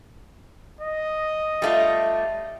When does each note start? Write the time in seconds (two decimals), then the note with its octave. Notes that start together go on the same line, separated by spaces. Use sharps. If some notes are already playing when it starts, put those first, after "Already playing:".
0.81 D#5
1.62 G3 A3 F4